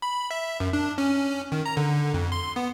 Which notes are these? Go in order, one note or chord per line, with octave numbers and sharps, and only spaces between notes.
B5
E5
F#2
D4
C#4
D#3
A#5
D3
F2
C6
B3